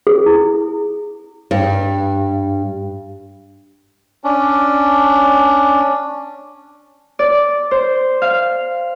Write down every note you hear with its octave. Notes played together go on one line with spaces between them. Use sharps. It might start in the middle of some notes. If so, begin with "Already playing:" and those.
G#4
E4
G2
C#4 D4
D5
C5
F5